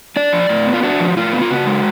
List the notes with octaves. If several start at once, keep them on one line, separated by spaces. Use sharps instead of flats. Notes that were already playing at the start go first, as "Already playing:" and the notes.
D4 D5
F3
A2
B3
F4
D4 F#4
F3
A2 F4
B3
F4
C#3 F#4
G#3